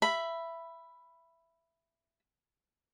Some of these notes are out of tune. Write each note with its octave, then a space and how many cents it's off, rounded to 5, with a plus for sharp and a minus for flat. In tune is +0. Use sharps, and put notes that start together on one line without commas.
E5 +15 B5 +0